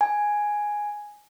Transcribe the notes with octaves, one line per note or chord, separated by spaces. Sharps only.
G#5